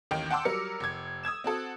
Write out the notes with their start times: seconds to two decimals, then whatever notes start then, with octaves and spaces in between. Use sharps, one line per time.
0.11 A1 D#2 D#3 G5
0.30 F#5 G5 A5 C6 D6 E6
0.45 F#3 G3 A#4 C#7
0.80 F1 G#6
1.23 D#6 E6 G#6 E7
1.44 C4 F#4 A4